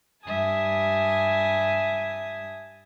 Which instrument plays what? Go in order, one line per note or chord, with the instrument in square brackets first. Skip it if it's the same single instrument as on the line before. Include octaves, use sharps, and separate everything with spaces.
[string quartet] G2 G3 E5 G#5 A5 D#6